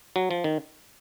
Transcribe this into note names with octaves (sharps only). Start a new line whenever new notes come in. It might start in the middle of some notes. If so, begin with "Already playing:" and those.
F#3
F3
D#3